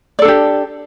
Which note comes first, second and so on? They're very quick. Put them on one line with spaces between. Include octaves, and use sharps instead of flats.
D5 A4 D4 G4